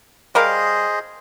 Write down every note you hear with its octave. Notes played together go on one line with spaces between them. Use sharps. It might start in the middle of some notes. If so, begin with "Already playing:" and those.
G3 G#4 A#4 C5 D#5 F5